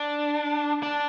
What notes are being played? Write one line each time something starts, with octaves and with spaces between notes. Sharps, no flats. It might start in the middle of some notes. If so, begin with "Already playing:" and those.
Already playing: D4
D4